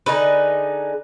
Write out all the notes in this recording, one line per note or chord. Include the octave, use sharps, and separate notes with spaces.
D3 D#4 G#4 B4